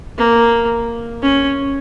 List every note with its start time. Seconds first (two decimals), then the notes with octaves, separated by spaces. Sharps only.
0.18 A#3
1.22 C#4